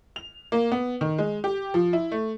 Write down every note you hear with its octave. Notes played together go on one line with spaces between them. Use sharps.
F7
A#3
B3
D#3
G#3
G4
F3
E4
A3